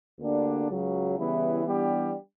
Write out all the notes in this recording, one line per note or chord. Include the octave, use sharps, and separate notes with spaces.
D2 D3 A#3 D4 G4
C#2 C#3 F#3
C#3 E3 G3 B3 E4
E3 G3 B3 D4 G4